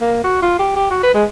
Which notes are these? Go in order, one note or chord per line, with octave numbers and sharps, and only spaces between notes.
A#3
F#4
F4
G4
G4
F#4
B4
G#3